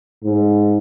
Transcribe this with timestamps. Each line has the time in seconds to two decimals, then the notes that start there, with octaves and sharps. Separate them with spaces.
0.24 G#2